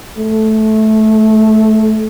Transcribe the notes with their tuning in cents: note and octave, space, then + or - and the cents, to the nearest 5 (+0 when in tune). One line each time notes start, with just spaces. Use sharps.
A3 -15